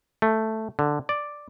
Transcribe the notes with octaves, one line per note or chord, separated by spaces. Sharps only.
A3
D3
D5